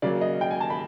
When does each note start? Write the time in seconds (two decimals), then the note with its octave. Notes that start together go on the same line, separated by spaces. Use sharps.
0.02 C#3 F#3 A#3 D5
0.21 D#5
0.41 G5
0.51 G#5
0.60 A5
0.70 B5